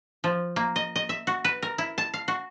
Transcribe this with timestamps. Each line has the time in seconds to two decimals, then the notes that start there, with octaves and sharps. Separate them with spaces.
0.24 F3
0.56 A#3
0.76 D#5
0.96 D#5
1.09 E5
1.27 F#4
1.44 B4
1.62 A#4
1.78 E4
1.98 A5
2.14 F5
2.28 F#4